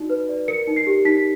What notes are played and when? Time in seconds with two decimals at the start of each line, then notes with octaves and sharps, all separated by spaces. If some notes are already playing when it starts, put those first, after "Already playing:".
Already playing: D#4 F#4 D5
0.10 B4
0.29 D5
0.48 A#4 C#7
0.67 D#4
0.76 C7
0.87 G4
1.05 D#4 B6